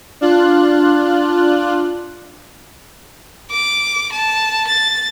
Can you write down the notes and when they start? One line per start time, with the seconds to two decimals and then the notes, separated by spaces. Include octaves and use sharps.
0.21 D4 F4 F#6
3.51 D6
4.12 A5
4.67 A6